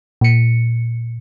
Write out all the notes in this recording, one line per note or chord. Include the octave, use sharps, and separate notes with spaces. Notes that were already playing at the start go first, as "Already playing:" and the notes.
A#2 C#7